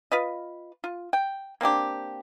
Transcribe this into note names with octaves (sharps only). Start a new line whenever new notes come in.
F4 B4 D#5
F4
G5
A#3 C4 D4 G4